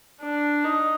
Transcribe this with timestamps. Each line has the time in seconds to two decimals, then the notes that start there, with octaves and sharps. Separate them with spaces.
0.21 D4
0.64 D#4